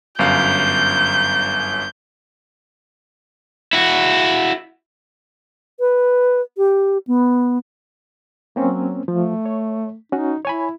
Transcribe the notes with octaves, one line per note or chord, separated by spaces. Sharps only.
G1 F#2 F5 G6
E4 F#4
B4
G4
B3
F#3 A#3 C4 C#4
F3 A3
C#5
C#4 D#4 F#4
E4 C#5 G#5 B5